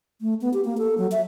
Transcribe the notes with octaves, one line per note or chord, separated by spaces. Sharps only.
A3
B3
G4
A#3
A4
F#3
E5